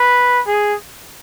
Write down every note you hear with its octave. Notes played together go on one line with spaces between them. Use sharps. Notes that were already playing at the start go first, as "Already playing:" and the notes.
Already playing: B4
G#4